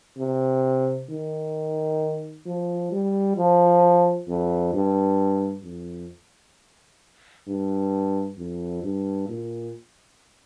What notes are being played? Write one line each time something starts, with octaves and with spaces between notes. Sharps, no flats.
C3
D#3
F3
G3
F3
F2
G2
F2
G2
F2
G2
A#2